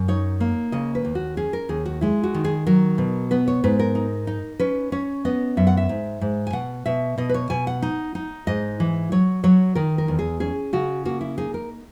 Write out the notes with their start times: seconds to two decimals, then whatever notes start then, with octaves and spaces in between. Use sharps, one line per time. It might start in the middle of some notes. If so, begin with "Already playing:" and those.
Already playing: F#2
0.08 D#4 C#5
0.40 A#3
0.72 C#3 D#5
0.95 B4
1.05 D#2
1.15 F#4
1.37 C#4 G#4
1.53 A#4
1.69 D#2 G#4
1.85 F#4
2.01 G#3 E4
2.23 F#4
2.34 D#3
2.44 G#4
2.67 F#3 A#4
2.98 B2
3.31 B3 B4
3.48 C#5
3.64 G#2 B4
3.79 A#4
3.95 D#4
4.27 D#4
4.60 C#4 B4
4.92 C#4 C#5
5.25 B3 D#5
5.57 F#2 E5
5.67 F#5
5.77 E5
5.89 G#2
6.21 G#2
6.47 G#5
6.53 B2 F#5
6.86 B2 E5
7.18 B2 D#5
7.29 B4
7.34 C#5
7.50 B2 G#5
7.67 F#5
7.82 D#4
8.15 D#4
8.47 G#2 D#5
8.80 E3
9.12 F#3 C#5
9.44 F#3 C#5
9.75 D#3 A#4
9.98 A#4
10.08 E2
10.19 G#4
10.40 C#4 G#4
10.73 C#3 F#4
11.05 A#3 F#4
11.21 E4
11.38 D#4 G#4
11.54 A#4